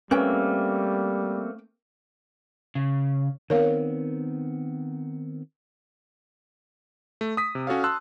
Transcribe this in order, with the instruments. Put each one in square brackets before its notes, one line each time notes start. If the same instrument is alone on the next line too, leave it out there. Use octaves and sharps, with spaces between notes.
[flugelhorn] G3 [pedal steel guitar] A3 A#3 C4 [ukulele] C#4 B4 G5
[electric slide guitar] C#3
[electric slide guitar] D#3 B3 C4 [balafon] A#4 C#5 F5
[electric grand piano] A3
D#6 B6
C3
C#4 F#4 A4 C#5 F5
A5 C6 E6 F#6